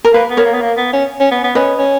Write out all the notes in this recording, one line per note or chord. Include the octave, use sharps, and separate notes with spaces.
A#4
A#3 B4
B3
A#4 C#5
A#3
B3
A#3
B3
C#4
C#4
B3
B3
C#4 B4 D#5
C#4